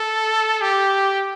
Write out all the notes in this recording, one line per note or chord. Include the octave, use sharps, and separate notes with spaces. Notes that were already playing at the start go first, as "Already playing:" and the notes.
Already playing: A4
G4